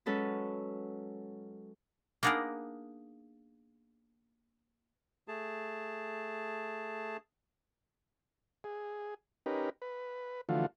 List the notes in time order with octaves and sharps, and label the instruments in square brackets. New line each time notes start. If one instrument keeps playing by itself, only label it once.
[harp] F#3 G#3 C#4 A4 B4
[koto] A#3 B3 D4 D#4 G#4 A#4
[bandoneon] A3 G#4 A5
[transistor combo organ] G#4
C#4 D#4 G4 A#4 B4
B4
D3 E3 F3 A3 F4 F#4